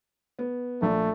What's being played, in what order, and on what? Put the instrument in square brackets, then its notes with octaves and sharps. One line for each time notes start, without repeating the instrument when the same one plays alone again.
[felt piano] B3
[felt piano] A#1 [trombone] A3